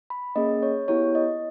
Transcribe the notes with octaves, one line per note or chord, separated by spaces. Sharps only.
B5
A#3 C#4 G#4 D#5
C#5
B3 E4 G4 C#5
D#5